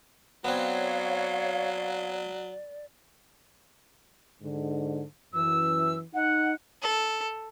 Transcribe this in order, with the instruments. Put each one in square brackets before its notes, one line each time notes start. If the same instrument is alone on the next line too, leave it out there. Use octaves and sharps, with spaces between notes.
[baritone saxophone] F#3 [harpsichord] B3 C4 [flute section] C#5 F5 [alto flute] D5
[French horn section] G#2 D3
[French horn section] F#2 E3 [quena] E6
[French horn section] D#4 [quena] F#5
[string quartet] A4